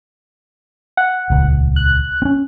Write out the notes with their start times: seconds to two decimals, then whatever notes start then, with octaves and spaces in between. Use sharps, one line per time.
0.97 F#5
1.30 D#1 C#2
1.76 F#6
2.22 C4 C#4